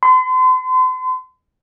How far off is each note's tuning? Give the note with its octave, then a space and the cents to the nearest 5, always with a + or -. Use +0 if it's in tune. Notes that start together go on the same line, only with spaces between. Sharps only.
C6 -40